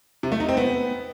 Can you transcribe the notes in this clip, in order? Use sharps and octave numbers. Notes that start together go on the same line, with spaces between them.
C3
A3
D#4
C4
B3